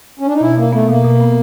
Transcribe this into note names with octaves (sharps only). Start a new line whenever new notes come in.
C#4
D4
D#4
B2 E4
B2 A#3
A3 B3
B2 A#3
B2
B3